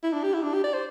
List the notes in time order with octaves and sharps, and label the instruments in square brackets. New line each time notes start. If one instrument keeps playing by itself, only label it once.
[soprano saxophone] E4
D4
G4
E4
D4
G4
D5
C5